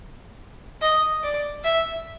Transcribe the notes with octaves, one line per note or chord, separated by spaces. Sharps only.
D#5
D5
E5